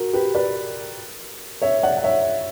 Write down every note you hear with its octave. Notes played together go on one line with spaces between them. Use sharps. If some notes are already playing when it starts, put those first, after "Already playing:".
Already playing: F#4 A#4
G4 B4
B4 D5
C#5 E5
D5 F#5
F#5
C#5 E5